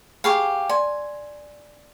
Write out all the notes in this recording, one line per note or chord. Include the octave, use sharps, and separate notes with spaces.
G4 G#4 F5 B5 C#6
D5 G#5 C6